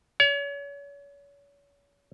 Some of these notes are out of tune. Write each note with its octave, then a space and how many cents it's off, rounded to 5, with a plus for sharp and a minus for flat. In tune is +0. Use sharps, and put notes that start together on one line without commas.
C#5 +35